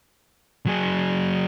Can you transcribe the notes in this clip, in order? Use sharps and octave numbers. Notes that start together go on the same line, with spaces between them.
F#3 G#4